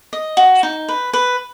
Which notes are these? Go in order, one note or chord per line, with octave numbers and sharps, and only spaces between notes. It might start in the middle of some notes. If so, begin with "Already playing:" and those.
D#5
F#4
D#4
B4
B4